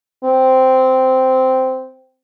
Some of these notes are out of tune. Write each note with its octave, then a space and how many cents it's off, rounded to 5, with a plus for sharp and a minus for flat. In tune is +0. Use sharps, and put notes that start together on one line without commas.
C4 -10